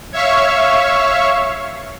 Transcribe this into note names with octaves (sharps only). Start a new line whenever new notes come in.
C#5 E5 F5 C#6